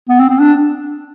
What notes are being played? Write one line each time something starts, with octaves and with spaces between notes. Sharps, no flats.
B3
C4
C4
D4